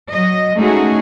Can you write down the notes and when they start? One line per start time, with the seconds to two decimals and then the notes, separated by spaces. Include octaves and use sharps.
0.11 F#3 D#5
0.56 G#3 A3 C#4 D#4 F#4 G#4